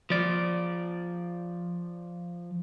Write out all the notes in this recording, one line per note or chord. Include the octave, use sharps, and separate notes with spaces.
F3 D5